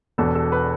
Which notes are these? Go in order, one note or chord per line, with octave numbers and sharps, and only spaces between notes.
E1 E2 B2 B3 A4
A4
B4